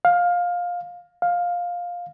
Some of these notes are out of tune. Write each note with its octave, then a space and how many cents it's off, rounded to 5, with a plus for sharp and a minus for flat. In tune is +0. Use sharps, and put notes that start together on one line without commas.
F5 +15
F5 +10